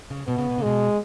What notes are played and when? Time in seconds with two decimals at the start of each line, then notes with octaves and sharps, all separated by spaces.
0.10 C#3
0.27 B2 B3
0.38 C#3
0.50 B2
0.58 C#3
0.62 B2 G#3